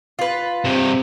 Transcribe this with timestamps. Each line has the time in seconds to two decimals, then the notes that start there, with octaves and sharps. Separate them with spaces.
0.19 F4 B4
0.65 G2 C3 C4